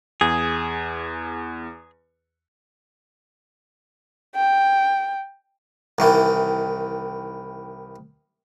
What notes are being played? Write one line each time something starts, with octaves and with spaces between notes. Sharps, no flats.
E2 G#4
G5
C2 D#3 E3